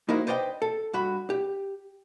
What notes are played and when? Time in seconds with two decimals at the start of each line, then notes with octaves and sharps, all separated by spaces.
0.09 A#3 D#4 E4 F#4 A#4 C5
0.27 B4 C5 D5 D#5 F5 G5
0.62 A4
0.93 G2 F#4 B5
1.30 G4